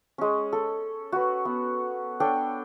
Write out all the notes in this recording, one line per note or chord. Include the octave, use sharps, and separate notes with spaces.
G#3 C#4
A4
F#4 B4
B3
D4 A4 C#5 G5